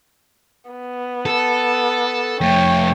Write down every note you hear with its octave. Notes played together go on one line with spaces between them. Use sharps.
B3
A4
F2 A3 C#5 G5